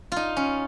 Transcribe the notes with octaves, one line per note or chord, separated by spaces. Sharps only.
D#4 F4
C#4